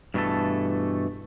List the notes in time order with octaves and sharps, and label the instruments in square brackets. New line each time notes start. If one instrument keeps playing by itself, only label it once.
[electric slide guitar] G2 B2 E3 A3 A4